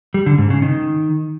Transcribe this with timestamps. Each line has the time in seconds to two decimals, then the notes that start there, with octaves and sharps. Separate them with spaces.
0.14 G3
0.26 D3
0.38 G#2
0.50 C#3
0.62 D#3